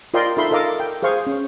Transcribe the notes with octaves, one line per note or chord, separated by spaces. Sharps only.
F4 A#4 D5 D#5 G5 C6
D#4 F4 A4 E5 B5 C6
A4 A#4 D#5 F5 D6
G5
G#4 C5 F5 C#6
C#4